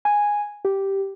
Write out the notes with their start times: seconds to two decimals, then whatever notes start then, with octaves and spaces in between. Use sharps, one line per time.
0.05 G#5
0.65 G4